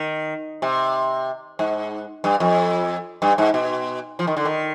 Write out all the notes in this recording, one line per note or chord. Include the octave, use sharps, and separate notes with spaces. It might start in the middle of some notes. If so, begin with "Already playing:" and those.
Already playing: D#3
C3
G#2
G2
F2
G2
G#2
B2
F3
D#3
D3
D#3